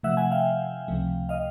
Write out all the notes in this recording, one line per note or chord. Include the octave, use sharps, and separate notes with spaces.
C3 F3 A3 E5 F#5
F#5 G#5
F5 G5
C#2 C3 F3 A3
D#5 F5